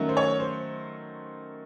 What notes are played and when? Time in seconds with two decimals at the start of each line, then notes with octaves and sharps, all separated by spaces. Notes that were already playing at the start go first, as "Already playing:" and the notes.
Already playing: D#3 F#3 A3 C#4
0.09 C5
0.17 C#5
0.40 C5